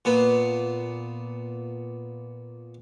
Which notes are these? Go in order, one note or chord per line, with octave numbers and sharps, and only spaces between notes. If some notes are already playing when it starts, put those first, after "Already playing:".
A#2 B3